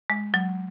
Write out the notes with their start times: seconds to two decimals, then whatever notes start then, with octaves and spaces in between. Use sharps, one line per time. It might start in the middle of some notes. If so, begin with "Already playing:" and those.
0.10 G#3
0.34 F#3